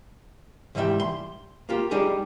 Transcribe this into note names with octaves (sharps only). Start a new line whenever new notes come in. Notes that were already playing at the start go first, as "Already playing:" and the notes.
C2 G#2 E3 G3 E5 G5
C6
A#3 F4 G4
G3 D4 D#4 G4 G#4